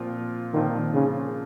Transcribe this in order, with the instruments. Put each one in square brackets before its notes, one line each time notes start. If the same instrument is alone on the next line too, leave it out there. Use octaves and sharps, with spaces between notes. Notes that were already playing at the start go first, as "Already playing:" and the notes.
Already playing: [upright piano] A#2 F3 C4 F4
[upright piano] A#2 F3 C4 F4 [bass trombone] D#3
[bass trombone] C#3